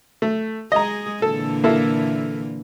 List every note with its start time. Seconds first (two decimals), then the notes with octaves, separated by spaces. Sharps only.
0.22 A3
0.72 G#3 G#4 D#5 A#5
1.22 A#2 D3 E3 A4
1.64 A#3 E4 A4